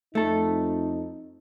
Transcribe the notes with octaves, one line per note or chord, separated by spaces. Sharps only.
F2 A3 D#4 A4